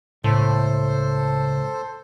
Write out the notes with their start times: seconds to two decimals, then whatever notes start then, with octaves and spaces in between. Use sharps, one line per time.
0.24 C#2 A2 A4 C5